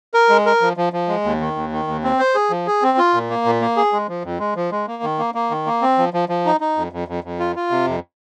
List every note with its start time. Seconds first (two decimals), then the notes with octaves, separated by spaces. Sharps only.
0.14 A#4
0.29 G#3
0.46 A#4
0.61 F3
0.77 F3
0.93 F3
1.08 G#3
1.24 D#2
1.40 D#3
1.56 D#2
1.72 D#3
1.87 D#2
2.04 C4
2.19 C5
2.35 G#4
2.50 F3
2.67 G#4
2.82 C4
2.98 F4
3.14 A#2
3.30 A#3
3.45 A#2
3.61 A#3
3.77 G#4
3.93 G#3
4.09 F3
4.24 F2
4.39 G#3
4.56 F3
4.72 G#3
4.87 A#3
5.03 D#3
5.19 A#3
5.35 A#3
5.51 D#3
5.66 A#3
5.82 C4
5.98 F3
6.14 F3
6.29 F3
6.46 D#4
6.61 D#4
6.76 F2
6.92 F2
7.08 F2
7.24 F2
7.40 F4
7.56 F4
7.71 C3
7.87 F2